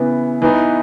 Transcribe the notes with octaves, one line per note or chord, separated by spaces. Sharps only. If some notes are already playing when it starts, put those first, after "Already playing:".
Already playing: C#3 E3 B3
E3 B3 D#4